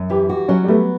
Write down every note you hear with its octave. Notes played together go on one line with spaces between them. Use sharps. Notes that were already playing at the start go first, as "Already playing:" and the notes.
Already playing: F#2
E3 G4
F#4 G4
F#3 C#4
G3
A3 B3